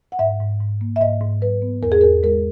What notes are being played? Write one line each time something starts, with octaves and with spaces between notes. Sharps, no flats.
F#5
G#2 E5
G#2
G#2
A#3
E5
G#2 D#5
G#2
F#3 B4
B3
E2 A#4
G#4
E2 A#4
G#3 A#4